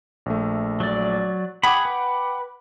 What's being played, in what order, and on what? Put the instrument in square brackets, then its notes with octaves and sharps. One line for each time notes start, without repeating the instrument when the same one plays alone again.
[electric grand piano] A#1 A3
[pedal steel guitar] F#3 D5
[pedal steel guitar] G#4 B5 [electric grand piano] F#5 G5 D6
[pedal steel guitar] B4